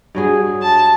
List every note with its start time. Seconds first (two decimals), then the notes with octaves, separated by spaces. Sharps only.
0.15 G2 F#3 G#4
0.62 A5